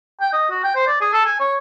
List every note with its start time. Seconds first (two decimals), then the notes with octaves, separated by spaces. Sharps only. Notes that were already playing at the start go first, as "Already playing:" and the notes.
0.21 G5
0.33 D#5
0.51 F#4
0.64 G5
0.75 C5
0.87 D5
1.01 G#4
1.13 A4
1.25 G#5
1.40 C#5